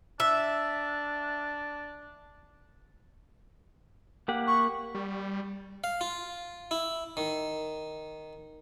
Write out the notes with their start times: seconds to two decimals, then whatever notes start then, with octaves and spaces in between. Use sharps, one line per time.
0.20 D4 E5
4.28 A#3 G4 F#5
4.47 C#6
4.95 G3
5.84 F5
6.01 F4
6.71 E4
7.17 D#3